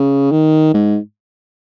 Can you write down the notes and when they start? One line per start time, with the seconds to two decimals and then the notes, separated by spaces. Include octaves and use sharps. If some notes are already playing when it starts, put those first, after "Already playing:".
Already playing: C#3
0.32 D#3
0.74 G#2